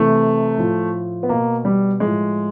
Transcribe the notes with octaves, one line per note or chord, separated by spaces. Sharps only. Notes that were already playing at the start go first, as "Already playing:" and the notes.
Already playing: C3 E3 A3
A2 F3
B3
B2 A#3
G3
A2 F3 G#3